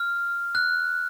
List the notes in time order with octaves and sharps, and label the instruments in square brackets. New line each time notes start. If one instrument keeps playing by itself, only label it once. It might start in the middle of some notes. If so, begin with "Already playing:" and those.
Already playing: [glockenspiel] F6
F#6